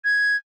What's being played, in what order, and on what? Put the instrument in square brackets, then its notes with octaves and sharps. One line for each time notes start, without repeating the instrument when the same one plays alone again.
[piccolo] G#6